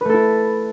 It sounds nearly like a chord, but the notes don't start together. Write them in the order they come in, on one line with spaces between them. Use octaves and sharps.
B4 A3 A4 E4